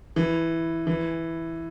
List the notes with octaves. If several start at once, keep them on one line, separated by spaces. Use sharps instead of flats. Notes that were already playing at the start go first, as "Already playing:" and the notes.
E3
E3